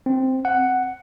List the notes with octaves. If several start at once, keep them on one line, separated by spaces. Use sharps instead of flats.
C4
F#5